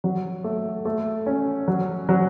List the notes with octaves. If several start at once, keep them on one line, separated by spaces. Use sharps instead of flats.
F#3
A3
A3
C#4
F#3
F#3